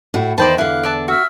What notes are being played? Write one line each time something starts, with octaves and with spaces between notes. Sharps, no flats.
A2 E4 F#4
E2 D#3 D#4 C5 D5 G5 A5 B5
E2 D3 E4 F5 F#6
D5 E5 A5
F#4 E5 E6 F6